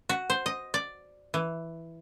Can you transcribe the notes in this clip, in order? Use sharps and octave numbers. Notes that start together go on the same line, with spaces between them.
F#4
C5
D#5
D5
E3